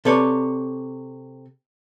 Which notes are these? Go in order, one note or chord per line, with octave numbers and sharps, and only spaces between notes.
C3 A4 B4 C#5 D5